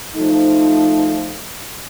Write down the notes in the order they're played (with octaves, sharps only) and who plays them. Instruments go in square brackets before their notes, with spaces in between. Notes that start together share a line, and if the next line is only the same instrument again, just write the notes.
[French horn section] F3 A3 D#4